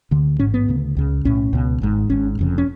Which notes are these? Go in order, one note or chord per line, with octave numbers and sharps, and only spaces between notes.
D2 D3
A1 G#2 C#4
B3
D2 C#3
C#2 C#3
B1 A2 C#4
C#2 B2
G#1 G#2
G#1 G#2 C#4
F1 F2 C#3
C#4